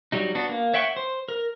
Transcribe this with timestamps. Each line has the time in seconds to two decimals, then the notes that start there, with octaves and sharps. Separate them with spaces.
0.12 F#3 G3 D#4
0.35 B3 D4 F#4
0.49 A#3
0.74 C#5 E5 F#5 G5 C#6
0.97 C5
1.28 A#4